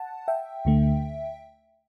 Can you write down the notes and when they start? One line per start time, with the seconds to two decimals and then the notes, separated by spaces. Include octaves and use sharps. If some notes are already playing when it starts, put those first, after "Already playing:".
Already playing: F#5 A5
0.28 E5 G5
0.65 D2 D3 A3